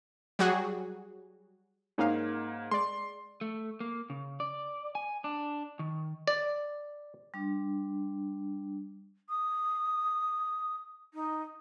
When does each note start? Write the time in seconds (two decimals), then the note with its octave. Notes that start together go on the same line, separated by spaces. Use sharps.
0.39 F#3 G3 F#4 G#4
1.98 G#2 A#3 C#4 D#4 F5
2.71 G#3 D5 C6
3.41 A3
3.80 A#3
4.10 C#3
4.40 D5
4.95 G#5
5.24 D4
5.79 D#3
6.27 D5
7.34 G3 D4
9.29 D#6
11.14 D#4